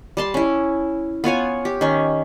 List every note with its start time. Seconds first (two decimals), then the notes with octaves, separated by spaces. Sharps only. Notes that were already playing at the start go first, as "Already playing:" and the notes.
0.17 G3 A5 C6
0.34 C#4 E4
1.24 B3 F4 C#5 G#5
1.65 G4
1.81 D#3 C#4